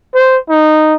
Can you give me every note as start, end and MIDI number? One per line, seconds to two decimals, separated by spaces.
0.14 0.38 72
0.49 0.96 63